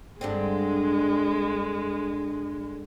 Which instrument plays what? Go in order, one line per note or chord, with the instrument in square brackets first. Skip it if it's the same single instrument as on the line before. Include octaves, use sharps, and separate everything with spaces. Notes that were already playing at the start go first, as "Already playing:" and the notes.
[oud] G2 D3 C4 [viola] G#3